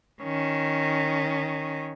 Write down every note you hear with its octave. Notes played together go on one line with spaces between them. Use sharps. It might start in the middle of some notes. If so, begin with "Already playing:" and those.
D#3 C#4